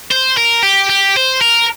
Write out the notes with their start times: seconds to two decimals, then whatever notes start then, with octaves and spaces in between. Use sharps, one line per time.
0.11 C5
0.37 A#4
0.63 G4
0.89 G4
1.16 C5
1.41 A#4